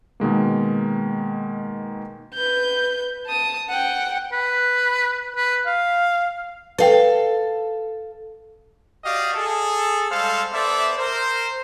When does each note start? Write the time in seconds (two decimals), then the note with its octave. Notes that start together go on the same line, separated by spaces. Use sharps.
0.20 B2 D#3 G#3 A#3
2.34 B4 G6
3.26 A5 D#6
3.69 F#5 G5
4.32 B4
5.37 B4
5.66 F5
6.79 A4 B4 F5 G5
9.04 F#4 G4 D5 D#5 F5
9.34 G#4 A4
10.11 G3 G#3 A4 C5 F5
10.52 B3 A4 C5 D5 E5
10.97 A#4 C5